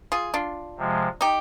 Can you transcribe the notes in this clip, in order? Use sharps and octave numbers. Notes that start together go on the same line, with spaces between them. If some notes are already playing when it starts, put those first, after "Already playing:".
F4 G#4
D4 F4
C3 F3 G#3
D#4 G4